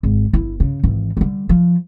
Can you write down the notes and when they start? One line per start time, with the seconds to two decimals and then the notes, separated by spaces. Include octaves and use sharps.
0.03 G#1
0.33 G1 E4
0.60 C#3
0.84 G#1 E3
1.17 D3 G3
1.49 F3